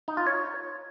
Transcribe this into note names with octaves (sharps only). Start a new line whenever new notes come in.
D#4
F4
C#5